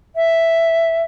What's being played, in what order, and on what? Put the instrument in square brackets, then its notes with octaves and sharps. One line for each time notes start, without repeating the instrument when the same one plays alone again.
[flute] E5